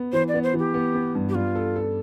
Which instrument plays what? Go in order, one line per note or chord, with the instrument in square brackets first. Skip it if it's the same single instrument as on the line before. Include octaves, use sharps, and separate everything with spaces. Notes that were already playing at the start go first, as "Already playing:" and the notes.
Already playing: [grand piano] B3
[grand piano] E3 [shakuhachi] C5
[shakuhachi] D5
[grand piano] B3
[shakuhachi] C5
[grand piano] E3
[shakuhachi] G4
[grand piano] B3
B3
G2
[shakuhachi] G4
[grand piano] G3 [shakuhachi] F4
[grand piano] A4
A4